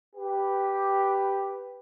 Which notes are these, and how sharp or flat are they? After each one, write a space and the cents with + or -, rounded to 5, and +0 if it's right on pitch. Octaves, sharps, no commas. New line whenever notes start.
G4 +0 B4 +0